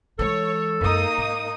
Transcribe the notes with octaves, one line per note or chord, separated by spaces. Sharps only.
E3 G#3 A4 C#5
F#2 G#3 A#3 D#4 D#6
G#2